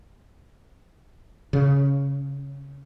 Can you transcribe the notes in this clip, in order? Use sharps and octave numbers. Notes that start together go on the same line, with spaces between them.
C#3